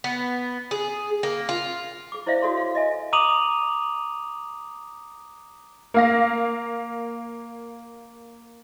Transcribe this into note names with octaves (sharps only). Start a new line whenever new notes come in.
B3
G#4
A#3
F4
G#4 D6
E4 C5 D5 E5 F5
F#4 A4 C#5 C6
F5
D#5 E5 G#5
A#5 D6 D#6 D#7 F7 F#7
A#3 F5 A#6